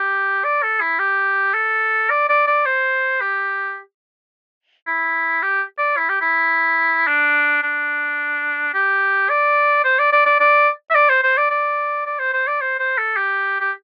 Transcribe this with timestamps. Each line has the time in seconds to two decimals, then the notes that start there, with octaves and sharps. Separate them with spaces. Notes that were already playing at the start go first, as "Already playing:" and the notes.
Already playing: G4
0.44 D5
0.63 A4
0.81 E4
0.99 G4
1.54 A4
2.10 D5
2.29 D5
2.47 D5
2.66 C5
3.21 G4
4.87 E4
5.42 G4
5.78 D5
5.97 E4
6.09 G4
6.22 E4
7.07 D4
7.63 D4
8.74 G4
9.29 D5
9.84 C5
9.99 D5
10.12 D5
10.26 D5
10.40 D5
10.91 E5
10.95 D5
11.10 C5
11.23 C5
11.37 D5
11.50 D5
12.06 D5
12.19 C5
12.33 C5
12.48 D5
12.61 C5
12.79 C5
12.98 A4
13.17 G4
13.60 G4